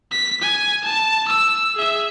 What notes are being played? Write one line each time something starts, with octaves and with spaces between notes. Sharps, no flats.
B6
G#5
A5
E6
G#4 E5